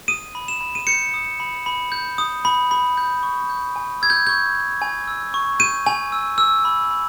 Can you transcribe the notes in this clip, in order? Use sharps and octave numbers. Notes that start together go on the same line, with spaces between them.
D#6 D#7
B5
E7
B5
D#7
G6 C#7
D#6
B5
B5
G6
D#6
B5
B5
G6
C#6
G6
G#5
E6 G#6
G6
C#6 G6
G6
G#5
E6
C#6
G6 D#7
G#5
E6
E6
B5
B5